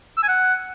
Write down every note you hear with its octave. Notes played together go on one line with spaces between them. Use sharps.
E6
G#5
F#5